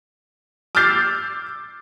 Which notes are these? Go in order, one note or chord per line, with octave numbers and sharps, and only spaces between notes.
D6 E6 F6 G6 A6 C7